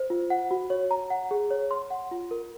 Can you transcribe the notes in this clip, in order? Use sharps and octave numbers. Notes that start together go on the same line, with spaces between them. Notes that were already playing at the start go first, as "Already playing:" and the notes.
Already playing: C5
F4
F#5
F#4
C#5
A#5
F#5
G#4
C#5
C6
F#5
F4
A#4